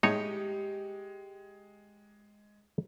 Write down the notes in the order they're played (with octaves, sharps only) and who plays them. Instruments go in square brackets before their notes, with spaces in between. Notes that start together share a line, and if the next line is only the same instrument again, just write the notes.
[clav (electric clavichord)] A2 D#4 C#5 [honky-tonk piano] G#3 [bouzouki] G4 D#5